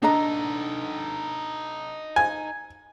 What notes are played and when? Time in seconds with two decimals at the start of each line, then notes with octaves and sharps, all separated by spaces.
0.03 D4 D#4 A4 D#5 A#5
2.16 G#5